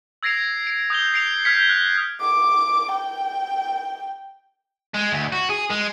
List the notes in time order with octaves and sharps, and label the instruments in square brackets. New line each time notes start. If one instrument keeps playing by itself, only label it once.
[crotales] E6 G#6 A#6 C7 D7 F7
D7
D#6 G6 F7 G7
C7 D7 F7
F6 G6 G#6 B6 C#7
F#6
[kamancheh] D6
G5
[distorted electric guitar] G#3
D2
F#4
G#4
G#3